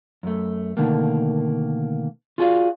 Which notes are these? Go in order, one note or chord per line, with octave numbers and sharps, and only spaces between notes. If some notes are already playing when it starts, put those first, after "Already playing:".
F#2 A3
B2 D3 D#3 A3 A#3
F4 F#4 G#4 C#5 D5 F5